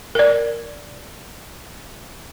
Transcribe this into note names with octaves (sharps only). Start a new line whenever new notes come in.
A#4 D5